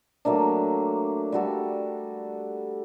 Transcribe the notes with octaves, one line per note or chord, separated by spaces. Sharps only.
F#3 A3 A#3 D4
G3 F#4 A4